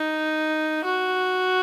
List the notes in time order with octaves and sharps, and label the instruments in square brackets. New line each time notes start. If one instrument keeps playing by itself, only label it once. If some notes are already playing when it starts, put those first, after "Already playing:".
Already playing: [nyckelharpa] D#4
F#4